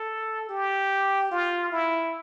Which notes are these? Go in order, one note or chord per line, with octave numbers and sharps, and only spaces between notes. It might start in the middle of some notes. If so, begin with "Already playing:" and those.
Already playing: A4
G4
F4
E4